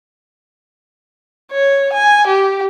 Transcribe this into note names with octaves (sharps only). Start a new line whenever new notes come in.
C#5
G#5
G4